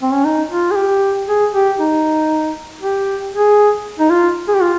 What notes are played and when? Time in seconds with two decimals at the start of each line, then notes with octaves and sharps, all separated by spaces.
0.02 C4
0.13 C#4
0.25 D#4
0.50 F4
0.71 G#4
0.75 G4
1.28 G#4
1.53 G4
1.79 D#4
2.82 G4
3.34 G#4
3.99 D#4
4.10 F4
4.48 G#4
4.54 G4
4.62 F4